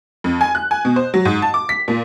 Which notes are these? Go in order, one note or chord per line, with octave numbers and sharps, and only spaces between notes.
F2
G#5
F#6
G#5
B2
C5
F#3
G#2
A5
D6
B6
A#2